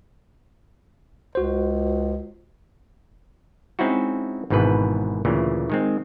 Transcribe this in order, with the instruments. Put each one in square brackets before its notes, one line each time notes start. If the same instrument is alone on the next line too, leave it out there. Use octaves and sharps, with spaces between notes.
[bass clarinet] C#2 [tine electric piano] F#4 C5
[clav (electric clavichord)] G#3 C4 C#4 D#4 E4 F#4
G#1 G#2 B2 E3 B4
D2 A#2 C#3 E3
D#3 G#3 C4